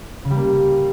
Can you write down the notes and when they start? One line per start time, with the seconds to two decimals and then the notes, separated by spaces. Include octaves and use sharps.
0.25 C#3
0.31 G3
0.37 A#3